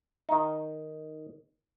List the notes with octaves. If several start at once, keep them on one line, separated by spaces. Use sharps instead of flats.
D#3 D#4